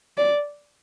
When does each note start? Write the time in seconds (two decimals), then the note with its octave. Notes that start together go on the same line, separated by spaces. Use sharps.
0.17 D5